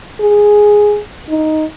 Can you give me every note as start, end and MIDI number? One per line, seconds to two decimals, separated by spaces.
0.20 1.00 68
1.29 1.65 63